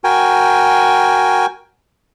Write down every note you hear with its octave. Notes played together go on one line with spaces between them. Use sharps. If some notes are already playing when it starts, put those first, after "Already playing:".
F#4 A#4 G5 G#5